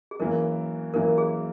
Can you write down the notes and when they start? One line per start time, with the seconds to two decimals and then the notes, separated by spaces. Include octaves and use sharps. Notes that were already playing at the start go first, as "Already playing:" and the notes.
0.11 G#4
0.20 F#2 E3 A#3 A#4
0.94 F#2 E3 A#3 A#4
1.18 G#4